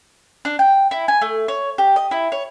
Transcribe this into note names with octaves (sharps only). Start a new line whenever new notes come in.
D4
G5
E4
G#5
A3
C#5
G4
D#5
E4
C#5